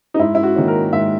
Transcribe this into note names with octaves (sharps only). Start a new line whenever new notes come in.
D#4
G#2 E4
E4
F#4
D#3 A#3 C#4
A#4
G#2 E5